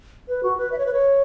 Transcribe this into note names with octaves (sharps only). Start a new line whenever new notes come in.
B4
F#4
B4
E5
C#5
B4
C#5